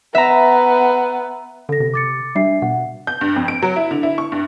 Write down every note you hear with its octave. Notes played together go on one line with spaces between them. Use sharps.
B3 E5 A#5
D3 A4 A#6
C3
D6 A6 C#7
G3 D4 E5 C7
B2 F#5
G6
G2
F2
D7
F#3
E4
D3
E4
C#6
G2